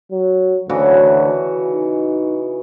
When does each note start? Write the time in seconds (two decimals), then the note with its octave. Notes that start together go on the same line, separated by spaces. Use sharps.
0.12 F#3
0.69 D2 C#3 E3 F#4
1.71 D#4